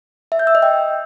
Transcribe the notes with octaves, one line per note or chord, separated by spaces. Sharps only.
E5
G6
E6
D#5
G5